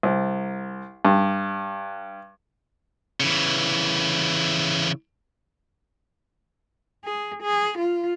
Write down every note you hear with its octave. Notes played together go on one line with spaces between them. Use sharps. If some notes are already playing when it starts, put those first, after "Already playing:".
C2
G2
C#3 E3
G#4
G#4
F4